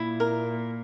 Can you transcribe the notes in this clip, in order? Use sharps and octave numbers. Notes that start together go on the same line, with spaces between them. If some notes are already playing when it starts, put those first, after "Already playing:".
Already playing: A#2 E4
A#4